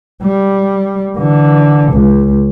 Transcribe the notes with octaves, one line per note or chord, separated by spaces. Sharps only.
G3
D3 E3
C#2